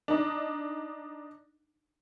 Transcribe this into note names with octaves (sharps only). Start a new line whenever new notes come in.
D4 D#4